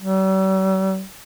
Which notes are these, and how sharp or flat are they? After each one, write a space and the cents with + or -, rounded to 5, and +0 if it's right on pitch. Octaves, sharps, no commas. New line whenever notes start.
G3 -45